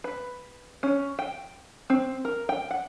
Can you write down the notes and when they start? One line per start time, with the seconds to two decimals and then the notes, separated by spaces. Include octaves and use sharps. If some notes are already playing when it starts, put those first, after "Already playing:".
0.04 B4
0.83 C#4
1.19 G5
1.90 C4
2.25 A#4
2.49 G5
2.71 F#5